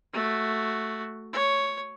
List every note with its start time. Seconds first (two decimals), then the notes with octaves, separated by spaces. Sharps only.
0.13 A3 F#4
1.33 C#5